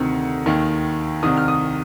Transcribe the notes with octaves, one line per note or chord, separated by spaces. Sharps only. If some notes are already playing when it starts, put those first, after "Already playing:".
Already playing: D2 C3 D#3
D#2 D#3
C2 C3 D#3 D#6
F6
D#6